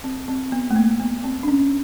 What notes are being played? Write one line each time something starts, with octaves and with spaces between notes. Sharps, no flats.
C4
C4
B3
A3
A#3
B3
C4
D4
C#4